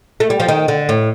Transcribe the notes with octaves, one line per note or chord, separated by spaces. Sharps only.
A3
G3
F3
D#3
D3
A2